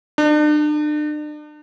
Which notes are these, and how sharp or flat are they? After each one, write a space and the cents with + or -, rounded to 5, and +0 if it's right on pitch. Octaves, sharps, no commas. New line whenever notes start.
D4 +40